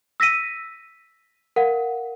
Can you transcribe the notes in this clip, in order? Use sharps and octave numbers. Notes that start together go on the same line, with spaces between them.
E6 A#6 B6 D#7
A#4 F5 F#5